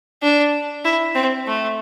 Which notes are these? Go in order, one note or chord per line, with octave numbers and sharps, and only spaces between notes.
D4
E4
C4
A3